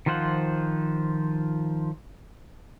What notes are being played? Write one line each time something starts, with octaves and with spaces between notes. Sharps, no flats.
D#3 F3 F4 C5 F#5